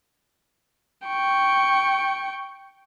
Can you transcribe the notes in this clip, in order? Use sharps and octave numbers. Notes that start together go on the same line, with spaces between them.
G5 C#6